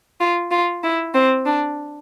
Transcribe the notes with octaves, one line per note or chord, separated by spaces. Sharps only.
F4
F4
E4
C4
D4